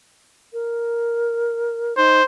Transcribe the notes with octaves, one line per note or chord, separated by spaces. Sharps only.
A#4
D#4 C5